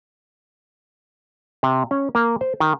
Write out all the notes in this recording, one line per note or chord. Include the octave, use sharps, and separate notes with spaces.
C3
C#4
A#3
C5
D#3